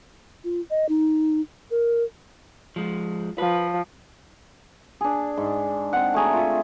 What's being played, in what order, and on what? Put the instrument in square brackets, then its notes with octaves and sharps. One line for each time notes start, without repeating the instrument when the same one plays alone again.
[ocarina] F4
D#5
D#4
A#4
[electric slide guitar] F3 G#3
[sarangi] F3 [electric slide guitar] B4
[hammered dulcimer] D4 G#4
G#2
C4 F#5
A3 F#4 G#4 A#5
F4 E5